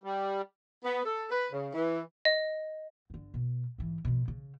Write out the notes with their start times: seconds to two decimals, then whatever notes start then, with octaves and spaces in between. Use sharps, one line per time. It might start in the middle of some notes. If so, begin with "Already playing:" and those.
0.04 G3
0.84 B3
1.05 A4
1.31 B4
1.52 C#3
1.74 E3
2.25 D#5
3.10 G1 D3
3.34 B2
3.78 G#2 E3
4.05 B2 F3
4.28 C#3